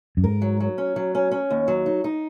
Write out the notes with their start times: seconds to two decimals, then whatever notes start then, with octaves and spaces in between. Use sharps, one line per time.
0.17 F#2
0.24 G#2 A#4
0.42 F#3
0.60 F#3
0.78 C#4
0.96 F#3
1.15 C#4
1.31 C#4
1.50 D#2
1.68 F#3
1.86 D#4
2.04 D#4